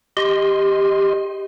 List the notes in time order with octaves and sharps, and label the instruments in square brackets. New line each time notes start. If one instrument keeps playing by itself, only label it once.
[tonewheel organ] G4 D#5 C6